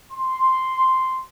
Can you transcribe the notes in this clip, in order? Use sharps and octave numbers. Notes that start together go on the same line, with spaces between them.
C6